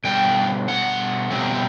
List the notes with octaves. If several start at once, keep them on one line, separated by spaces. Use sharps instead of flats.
B2 G3 D4 G5
F#5
B2 G3 C4